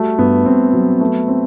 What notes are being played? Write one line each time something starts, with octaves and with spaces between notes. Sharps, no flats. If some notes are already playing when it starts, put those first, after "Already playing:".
Already playing: G3 A3 F#4
G2 B3
G2 C4
F#3
A3 B3
C4